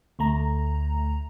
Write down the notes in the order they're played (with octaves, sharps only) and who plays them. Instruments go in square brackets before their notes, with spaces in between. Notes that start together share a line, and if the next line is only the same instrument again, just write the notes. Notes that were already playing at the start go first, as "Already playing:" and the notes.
[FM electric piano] D2 A3 A#5